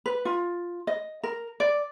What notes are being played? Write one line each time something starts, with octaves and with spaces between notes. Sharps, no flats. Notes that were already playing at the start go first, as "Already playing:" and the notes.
B4
F4
D#5
A#4
D5